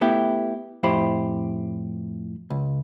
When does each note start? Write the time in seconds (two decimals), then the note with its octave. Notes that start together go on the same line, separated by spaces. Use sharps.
0.01 A3 B3 E4 G4
0.83 F2 A2 E4 G4 C5 B5
2.50 C#2